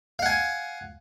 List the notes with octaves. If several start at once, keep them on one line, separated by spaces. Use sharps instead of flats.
F5 F#5 G#5